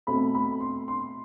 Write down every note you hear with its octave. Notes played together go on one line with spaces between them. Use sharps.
B2 A3 C4 B5
B5
C6
C6